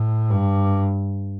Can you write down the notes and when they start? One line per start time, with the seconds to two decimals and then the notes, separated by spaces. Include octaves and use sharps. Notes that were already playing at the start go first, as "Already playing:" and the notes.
Already playing: A2
0.30 G2